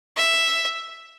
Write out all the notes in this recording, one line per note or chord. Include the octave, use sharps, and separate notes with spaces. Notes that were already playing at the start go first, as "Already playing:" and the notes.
E5